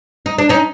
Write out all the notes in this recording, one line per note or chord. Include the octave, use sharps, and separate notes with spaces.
D#4
D4
C#4 D#4